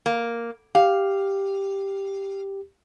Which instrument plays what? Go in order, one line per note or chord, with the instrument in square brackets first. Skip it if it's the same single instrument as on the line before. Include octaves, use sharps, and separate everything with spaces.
[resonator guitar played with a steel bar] A#3
[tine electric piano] G4 [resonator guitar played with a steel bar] F5